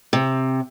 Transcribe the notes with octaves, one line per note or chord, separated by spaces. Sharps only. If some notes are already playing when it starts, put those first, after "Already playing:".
C3